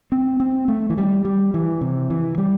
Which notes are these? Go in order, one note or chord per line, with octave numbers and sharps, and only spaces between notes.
C4
C4
A3
E3
G3
G3
E3
C3
E3
G3